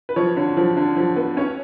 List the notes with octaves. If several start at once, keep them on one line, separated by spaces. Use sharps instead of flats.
B4
F3 C#5
D3
F3
D3
F3
B3
C#4 C#5